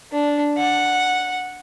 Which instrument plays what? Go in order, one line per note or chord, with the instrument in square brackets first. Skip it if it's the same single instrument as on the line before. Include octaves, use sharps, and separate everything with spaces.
[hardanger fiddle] D4
F#5